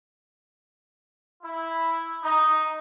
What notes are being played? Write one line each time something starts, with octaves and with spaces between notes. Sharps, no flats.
E4
D#4